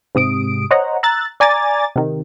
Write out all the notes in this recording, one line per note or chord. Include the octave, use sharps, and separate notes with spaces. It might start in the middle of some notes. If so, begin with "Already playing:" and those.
G#2 C3 D#6 D7
C5 C#5 D#5 F#5 A#5
A#5 E6 F#6 A6
D5 G#5 A#5 D6 A6
C3 D#3